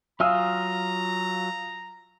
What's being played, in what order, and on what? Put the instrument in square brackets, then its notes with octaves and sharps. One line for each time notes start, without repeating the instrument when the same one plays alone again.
[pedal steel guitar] F#3 F4 G#5 [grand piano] F5 D#6 E6 [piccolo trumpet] A#5